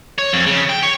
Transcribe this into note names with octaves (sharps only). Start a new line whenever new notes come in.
C#5
F2
C#3
G5
C#5